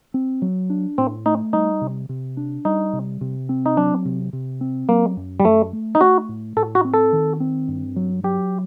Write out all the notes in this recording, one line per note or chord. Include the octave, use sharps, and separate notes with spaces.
C4
F#3
D4
A2 C4
A3 D#4
G3 D#4
C3
C3
D4
G3 D#4
C3
C3
C4
D#4
F#3 D4
C3
C3
C4
F#3 A#3
F#2
G3
F#2 A3
A3
D#4
A3 F#4
A2
A2 A4
F#4
C4
A4
D#3
C4
G2
F#3
F#3 G4